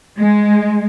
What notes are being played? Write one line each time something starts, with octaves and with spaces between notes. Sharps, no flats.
G#3